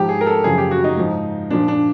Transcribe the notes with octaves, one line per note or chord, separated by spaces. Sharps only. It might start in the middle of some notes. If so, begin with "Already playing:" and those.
Already playing: G#2 F3 G4
G#4
A#4
A4
F#2 C#3 F3 G#4
G4
F#4
D#4
G#2 F3
A#2 F3 D4
D4